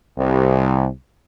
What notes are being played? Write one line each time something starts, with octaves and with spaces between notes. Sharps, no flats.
C2